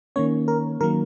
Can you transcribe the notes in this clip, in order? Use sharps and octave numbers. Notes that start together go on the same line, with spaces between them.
D#3 A#3 C#4 C#5
A#4
D#3 F#3 A#3 A#4